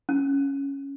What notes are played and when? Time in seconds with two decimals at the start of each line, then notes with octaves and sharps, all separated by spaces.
0.09 C#4